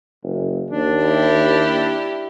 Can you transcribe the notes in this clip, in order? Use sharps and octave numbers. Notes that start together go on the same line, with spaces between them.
F#1
D#2 D4
E4 G4